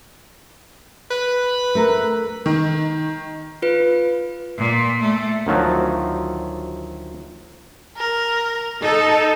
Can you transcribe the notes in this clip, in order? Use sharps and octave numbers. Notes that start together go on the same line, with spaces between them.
B4
A3 A#4
D#3
F4 B4
A#2
A3
D2 D#3 F3 F#3
A#4
D#4 A4